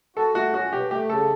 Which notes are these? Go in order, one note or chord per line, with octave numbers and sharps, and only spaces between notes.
F#4 A4
A3 F#4
C#4 F#4
B2 G4
A3 G4
C#3 A4